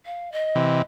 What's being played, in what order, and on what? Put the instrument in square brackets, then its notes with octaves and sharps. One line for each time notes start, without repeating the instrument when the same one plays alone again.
[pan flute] F5
D#5
[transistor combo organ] C3 E3